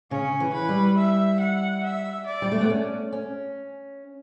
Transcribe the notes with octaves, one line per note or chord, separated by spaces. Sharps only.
C#3 C#4
E3
B4
G3
E5
F#5
E5
D5
G3
A3
B3
C#4
C#4